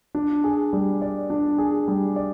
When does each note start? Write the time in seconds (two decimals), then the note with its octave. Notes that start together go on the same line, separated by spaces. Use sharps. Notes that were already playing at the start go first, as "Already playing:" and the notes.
0.15 D4
0.44 G#4
0.73 G3
1.02 D5
1.30 D4
1.58 G#4
1.88 G3
2.16 D5